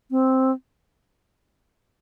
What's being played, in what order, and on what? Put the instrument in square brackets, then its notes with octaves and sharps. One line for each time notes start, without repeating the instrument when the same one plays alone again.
[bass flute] C4